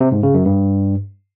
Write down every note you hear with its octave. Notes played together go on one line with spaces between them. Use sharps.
C3
G#2
C#3
F#2
G2